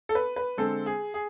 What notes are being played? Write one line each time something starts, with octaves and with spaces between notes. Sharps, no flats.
A4
B4
B4
D3 G#3 C4 A4
G#4
G#4